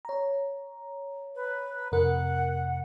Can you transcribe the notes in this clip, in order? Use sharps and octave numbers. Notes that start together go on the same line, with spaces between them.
C#5 A#5
B4
F2 C3 A#4 F#5